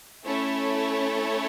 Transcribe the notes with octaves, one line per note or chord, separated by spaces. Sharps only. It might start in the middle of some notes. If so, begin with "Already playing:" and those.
A3 C#4 E4 A4 C#5